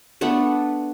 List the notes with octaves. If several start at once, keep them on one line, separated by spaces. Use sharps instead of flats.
A3 B3 D4 B4